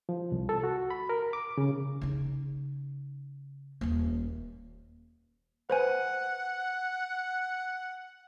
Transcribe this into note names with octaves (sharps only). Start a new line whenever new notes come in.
F3
C2
A4
F#4
B5
A#4
D6
C#3
C#3 D#4
D#1 A#3
B4 C5 F#5 G#5